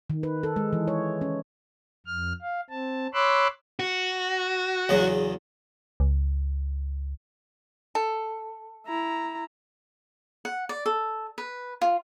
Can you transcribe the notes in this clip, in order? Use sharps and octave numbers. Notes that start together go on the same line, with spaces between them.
D#3
B4
A4
G#3
E3
C#5
C#4
F2 F6
F5
C4 A5
C#5 B5 C6 D6 E6 F#6
F#4
E2 C#3 F#3
C#2
A4
E4 A#5
F#5
D5
A4
B4
F4